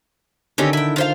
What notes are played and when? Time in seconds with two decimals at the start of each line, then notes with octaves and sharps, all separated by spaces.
0.58 D3 D#3 C4 C#4 G4
0.73 E4 G5
0.96 F4 C5 F5